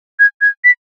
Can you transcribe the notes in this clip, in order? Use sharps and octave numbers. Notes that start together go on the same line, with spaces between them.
G#6
G#6
B6